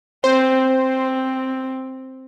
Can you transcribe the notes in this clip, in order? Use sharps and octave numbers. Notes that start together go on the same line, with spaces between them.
C4 C5
C4